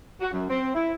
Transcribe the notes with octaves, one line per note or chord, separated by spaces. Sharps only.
F#4
F#2
C4
E4